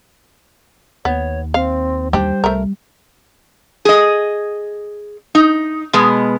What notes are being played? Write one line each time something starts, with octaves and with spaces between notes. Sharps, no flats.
D#2 B3 C#5
C4 F5
G3 D4 G4 C5
C2 A3 A#4
G#4 D#5
D#4
B2 G#3 B3